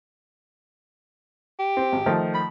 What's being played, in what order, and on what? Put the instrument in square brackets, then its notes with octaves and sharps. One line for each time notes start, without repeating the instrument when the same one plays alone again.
[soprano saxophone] G4
[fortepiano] C4
G#1
D#3 F3 A3
[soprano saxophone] B5